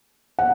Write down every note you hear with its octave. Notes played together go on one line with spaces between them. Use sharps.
F#5